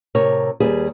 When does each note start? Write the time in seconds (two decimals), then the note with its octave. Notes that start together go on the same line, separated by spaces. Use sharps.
0.15 A2 C3 A#4 C#5
0.60 D#2 G3 G#4 B4